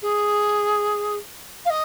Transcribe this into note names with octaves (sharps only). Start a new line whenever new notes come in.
G#4
F5
D#5